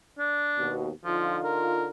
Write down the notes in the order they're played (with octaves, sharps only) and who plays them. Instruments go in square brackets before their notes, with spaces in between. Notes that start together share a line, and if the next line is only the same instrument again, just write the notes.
[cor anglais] D4
[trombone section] D#2 B2
[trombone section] D3 D#4 F4 [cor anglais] F3
[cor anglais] A#4